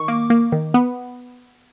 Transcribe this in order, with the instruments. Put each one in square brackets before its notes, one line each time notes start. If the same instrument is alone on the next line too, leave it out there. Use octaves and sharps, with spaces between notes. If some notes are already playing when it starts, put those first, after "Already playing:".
Already playing: [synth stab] D#3 C#6
A#3 D6
A#3
D#3
B3